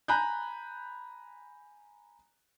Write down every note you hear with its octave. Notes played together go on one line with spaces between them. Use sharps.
G#5 A#5 B5 F#6 G6